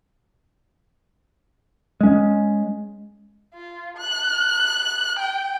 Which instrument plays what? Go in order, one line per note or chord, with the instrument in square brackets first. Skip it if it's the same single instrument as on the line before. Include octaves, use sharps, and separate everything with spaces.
[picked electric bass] G#3 C#4
[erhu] F4
F#6
G5